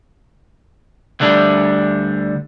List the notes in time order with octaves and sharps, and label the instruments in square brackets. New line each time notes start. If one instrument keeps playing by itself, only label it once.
[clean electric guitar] D2 D3 G3 D4